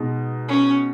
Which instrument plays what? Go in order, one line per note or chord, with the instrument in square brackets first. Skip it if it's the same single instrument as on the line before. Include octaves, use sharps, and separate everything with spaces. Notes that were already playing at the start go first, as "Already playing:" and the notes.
Already playing: [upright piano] B2 G#3 D#4
[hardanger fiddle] C#4